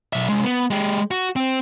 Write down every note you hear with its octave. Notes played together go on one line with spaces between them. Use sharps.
B1 E5
C2 G#3
B3
G#3 G4
F#4
C4